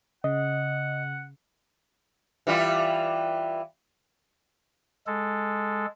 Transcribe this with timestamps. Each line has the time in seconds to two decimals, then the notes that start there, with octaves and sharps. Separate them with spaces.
0.24 C#3 D#5 F#5
2.47 E3 G3 F4
5.07 G#3 A4